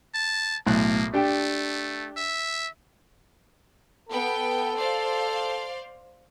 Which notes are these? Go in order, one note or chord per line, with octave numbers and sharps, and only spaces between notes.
A5
B1 A2 A#3 F#6
A3 D4 G4 G5
E5
B3 A4 G5
C5 D5 F5